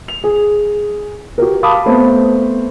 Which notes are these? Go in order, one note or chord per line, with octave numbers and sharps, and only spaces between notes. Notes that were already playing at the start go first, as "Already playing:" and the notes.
F7
G#4
F#4 G4 A#4
F5 A5 B5 D6 D#6
A3 B3 C4 C5